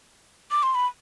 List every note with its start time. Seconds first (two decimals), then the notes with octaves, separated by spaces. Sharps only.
0.51 D6
0.63 C6
0.75 B5